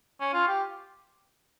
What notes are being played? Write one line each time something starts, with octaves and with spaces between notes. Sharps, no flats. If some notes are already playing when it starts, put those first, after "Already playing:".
C#4
F4
G4